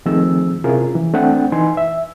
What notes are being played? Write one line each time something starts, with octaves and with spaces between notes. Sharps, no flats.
D#3 F3 A3 C4 G#4 E6
C3 C#4 E4 F4 G#4 A#4
E3
A3 C4 D4 F#5 G5
E3 D#4 B4 G#5 C6
E5